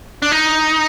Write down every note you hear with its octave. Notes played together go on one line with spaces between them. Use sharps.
D4
D#4